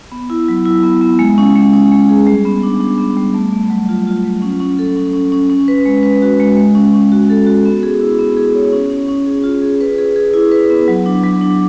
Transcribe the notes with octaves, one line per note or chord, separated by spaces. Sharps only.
B3
E4
F#3
E4
B3
B3
G#3
C#4
G#3
C#4
G#3
G#4
G3
B3
D4
D4
B3
G3
A3
A3
F#3
F4
F4
F#3
C#4
C#4
A4
C#4
C#4
C#4
C#4
B4
G#3
B4
F#4
G#3
G#3
C#4
C#4
F#4
A4
F#4
B3
G#4
E4
B3
G#4
C#5
C#4
C#4
C#4
G#4
F4
G#4
B4
G#4
G#4
E4
B4
B3
F#3
D4
F#3
D4